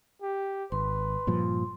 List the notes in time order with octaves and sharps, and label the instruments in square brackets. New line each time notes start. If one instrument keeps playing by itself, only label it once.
[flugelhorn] G4
[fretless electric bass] G#1 [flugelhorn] B4 [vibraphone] C6
[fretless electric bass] G2 A#2 F3